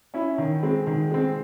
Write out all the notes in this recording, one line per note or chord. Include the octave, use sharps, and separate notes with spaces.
C#4 E4
D#3
G#3 C4
D#3
G#3 C4